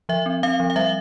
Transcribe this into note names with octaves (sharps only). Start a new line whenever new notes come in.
F3 E5
C4
C4 F5
F3
F5
G3 E5